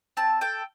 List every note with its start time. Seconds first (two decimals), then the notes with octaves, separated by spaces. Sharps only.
0.17 C4 A5
0.41 A4 G5